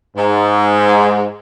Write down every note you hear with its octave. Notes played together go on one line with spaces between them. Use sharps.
G#2